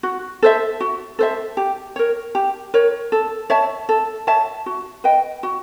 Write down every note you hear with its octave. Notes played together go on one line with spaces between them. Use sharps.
F#4
A4 C5 E5
F#4
A4 C5 E5
G4
A#4 C#5
G4
A#4 C#5
A4
C#5 E5 A5
A4
C#5 E5 A5
F#4
B4 D#5 G5
F#4